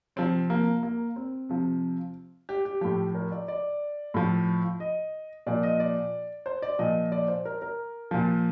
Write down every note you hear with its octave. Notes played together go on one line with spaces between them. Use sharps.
C3 F3 C4
A#3
A#3
C4
C3 F3
G4
G4
A2 F3 G4
A#4
D5
D5
A2 F3
D#5
A#2 F3 D5
D#5
D5
C5
D5
A#2 F3 D#5
D5
C5
A#4
A#4
A#2 F3